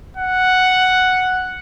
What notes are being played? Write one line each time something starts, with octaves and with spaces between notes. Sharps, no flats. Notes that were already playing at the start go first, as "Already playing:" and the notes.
F#5